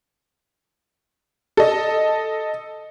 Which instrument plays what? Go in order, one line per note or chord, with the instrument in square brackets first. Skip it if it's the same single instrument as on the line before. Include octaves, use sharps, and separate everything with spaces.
[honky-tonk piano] A4 D#5